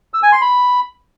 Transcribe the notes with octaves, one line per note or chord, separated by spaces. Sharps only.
E6
G#5
C6
B5